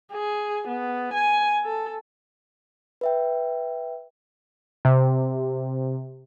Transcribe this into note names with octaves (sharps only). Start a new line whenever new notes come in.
G#4
B3
G#5
A4
B4 E5 G5
C3